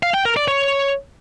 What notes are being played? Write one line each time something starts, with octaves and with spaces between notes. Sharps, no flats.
F5
G5
A#4
D5
C#5